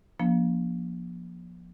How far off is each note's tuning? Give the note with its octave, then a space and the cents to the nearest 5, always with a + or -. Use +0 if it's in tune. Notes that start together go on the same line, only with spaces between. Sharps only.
F3 +5 A#3 +35 D4 -30